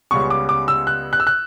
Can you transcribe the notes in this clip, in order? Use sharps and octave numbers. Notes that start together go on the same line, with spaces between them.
C#2 C#3 G3 B3 C#6
D6
D6
E6
F#6
F#6
E6
F#6